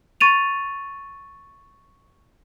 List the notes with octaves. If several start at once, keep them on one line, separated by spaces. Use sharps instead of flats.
C#6 A6 D#7 F7